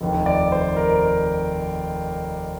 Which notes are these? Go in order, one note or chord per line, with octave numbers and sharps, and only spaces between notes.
F1 D#2 D#3
D5
C5
A#4